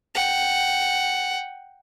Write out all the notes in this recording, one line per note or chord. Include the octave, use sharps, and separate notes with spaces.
F#5 G5